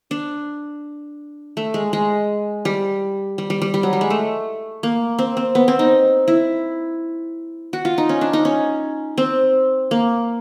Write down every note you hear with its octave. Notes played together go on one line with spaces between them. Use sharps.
D4
A3
G#3
G#3
G3
G3
G3
G3
G3
F#3
G3
G#3
A3
A#3
C4
C4
B3
C4
D#4
E4
F#4
F4
D#4
C#4
D4
D#4
C#4
C4
A#3